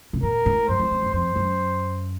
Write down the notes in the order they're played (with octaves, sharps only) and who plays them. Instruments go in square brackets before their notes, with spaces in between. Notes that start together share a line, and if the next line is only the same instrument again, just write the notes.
[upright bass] C3
[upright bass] A#2 [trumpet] A#4
[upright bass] A2
[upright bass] F#2 [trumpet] C5
[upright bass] F2
F2
F2
[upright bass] F2 [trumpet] C5
[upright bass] F#2